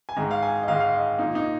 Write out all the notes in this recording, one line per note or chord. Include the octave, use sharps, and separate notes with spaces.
G#5
G#2 D#3 G#3 A#5
F5
G#5
D#5
G#2 D#3 G#3 F5
F5
D#5
A#2 A#3 D#4
D#4